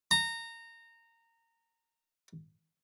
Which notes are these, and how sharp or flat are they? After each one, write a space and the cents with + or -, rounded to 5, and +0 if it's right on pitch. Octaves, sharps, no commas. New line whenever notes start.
A#5 -20